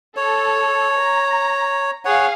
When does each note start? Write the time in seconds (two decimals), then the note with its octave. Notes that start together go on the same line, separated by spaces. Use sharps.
0.16 A4 C#5
0.99 A#5
2.05 G#4 C#5 F5 F#5